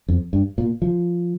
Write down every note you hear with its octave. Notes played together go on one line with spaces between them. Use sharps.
F2
G2
A#2
F3